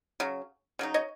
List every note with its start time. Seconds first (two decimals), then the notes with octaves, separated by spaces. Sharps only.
0.20 C#3 F#3
0.79 C#3 F#3 D#4
0.94 C#5 D#5